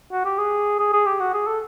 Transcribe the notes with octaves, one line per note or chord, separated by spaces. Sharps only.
F#4
G4
G#4
G#4
G#4
G4
F#4
G#4
A4